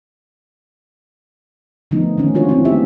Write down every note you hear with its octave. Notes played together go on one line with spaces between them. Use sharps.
D3 F3 A3 B3 D#4
D#3 A3 C#4
G#3 D4 F4 F#4 C#5
C4 E4 F4
A3 B3 F4 G4 E5